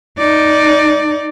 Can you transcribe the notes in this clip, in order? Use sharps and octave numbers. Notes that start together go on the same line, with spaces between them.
D#4 D5